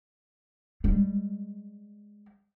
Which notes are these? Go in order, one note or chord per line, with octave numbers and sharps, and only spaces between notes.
G3 G#3